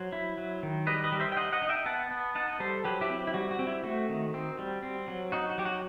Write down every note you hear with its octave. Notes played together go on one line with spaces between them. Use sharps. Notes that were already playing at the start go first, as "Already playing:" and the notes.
Already playing: F#3 C5
E4
F#3
D#3
G3 B4 D#5
B4 D#5
G3
C5 E5
G5
D#4 D#5 F#5
D#5 F#5
D#4
E5 G5
B3 F#5 A5
B3
D#4 F#5 A5
G3 A4 C5
F#3 G4 B4
E4 G4
C4
E4
G3 F#4
F#4
C4
E4
A3 F#4
D#3
C4
G3
C4
F#3
D#4 F#4
F#4
F#3 G4
F#4